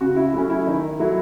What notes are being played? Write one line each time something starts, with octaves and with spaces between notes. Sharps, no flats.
C#3 F#4
E4
F#3 A3 C#4 E4
E4
D#3 D#4
F#3 A3 E4